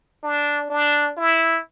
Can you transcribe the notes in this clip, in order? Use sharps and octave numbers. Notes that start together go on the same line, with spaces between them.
D4
D4
E4